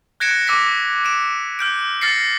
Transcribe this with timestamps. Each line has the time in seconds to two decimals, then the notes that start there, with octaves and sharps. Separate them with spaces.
0.20 F#6 G#6 A#6 C#7 D7 E7
0.47 D6 E6 A#6 B6
1.05 D7 E7
1.59 F6 G6 D7
2.01 F6 A6 A#6 C7 C#7